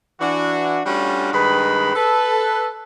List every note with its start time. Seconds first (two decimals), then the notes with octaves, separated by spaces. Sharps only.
0.19 E3 D4 F#4
0.86 G3 A3 C#4 D4 F4 F#4
1.33 G2 D#3 G#3 B4 B5
1.96 A4 B4